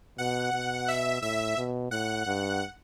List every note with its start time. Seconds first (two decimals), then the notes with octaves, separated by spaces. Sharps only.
0.18 B2 F#5
0.53 B2
0.88 E5
1.22 A2 E5
1.57 B2
1.91 A2 F#5
2.26 G2